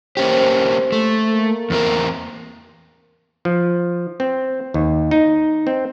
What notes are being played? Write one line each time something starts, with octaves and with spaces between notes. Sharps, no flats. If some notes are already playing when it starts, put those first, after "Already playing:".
A#3 C#4 G4 C5
A3
A#3
E2 C4 A#4
F3
C4
D#2
D#4
C4